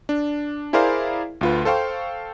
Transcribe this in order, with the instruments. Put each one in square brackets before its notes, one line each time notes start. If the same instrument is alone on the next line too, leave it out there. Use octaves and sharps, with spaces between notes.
[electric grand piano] D4
E4 G#4 A#4 C5 D5 F5
D2 F4 B4
A4 C5 F5 G5 C#6